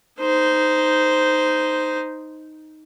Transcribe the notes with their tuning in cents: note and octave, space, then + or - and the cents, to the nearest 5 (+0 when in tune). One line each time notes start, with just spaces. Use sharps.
D#4 +0 C5 -10